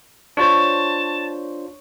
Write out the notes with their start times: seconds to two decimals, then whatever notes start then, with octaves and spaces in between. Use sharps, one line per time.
0.37 D4 F4 C5 C#5 A5